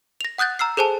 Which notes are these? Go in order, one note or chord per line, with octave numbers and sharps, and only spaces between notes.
A#6 F7
F#5 D#6 F#6 G6 A6
A#5 E6 F6 C7
G#4 A4 C5 G#5 A5